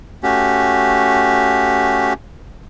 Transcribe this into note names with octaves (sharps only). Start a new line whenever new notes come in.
A3 C#4 F#4 G4